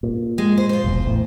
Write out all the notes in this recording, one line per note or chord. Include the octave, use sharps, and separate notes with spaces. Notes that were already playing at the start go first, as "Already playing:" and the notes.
A#2
G#3
C5
F4 C5
E1 A#1 E2
A1 E2 A2